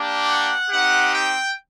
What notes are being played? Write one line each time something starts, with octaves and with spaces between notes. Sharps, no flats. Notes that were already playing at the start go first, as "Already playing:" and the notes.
Already playing: A#3 D4 G4
F#5
C4 D#4 G4 F#5
G5